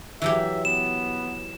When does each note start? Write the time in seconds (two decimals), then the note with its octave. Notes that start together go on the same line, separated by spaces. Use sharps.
0.22 E3 F#3 G4 E5
0.65 B3 E7